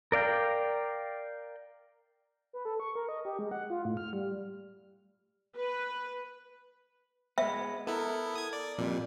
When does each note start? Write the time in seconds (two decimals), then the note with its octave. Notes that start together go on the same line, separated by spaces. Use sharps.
0.12 A#4 D5 F5 G5
2.53 B4
2.65 A4
2.80 C#6
2.96 A#4
3.09 D#5
3.25 G4
3.39 G#3
3.51 F#5
3.70 F4
3.85 A2
3.97 F6
4.13 G3
5.55 B4
7.38 G#3 B3 E5
7.87 B3 E4 A4 A#4
8.35 D#6 G#6
8.53 D5
8.78 F2 A#2 G3